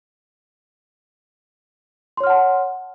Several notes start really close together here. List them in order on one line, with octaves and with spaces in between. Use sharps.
C6 C#5 F6 F#5 A5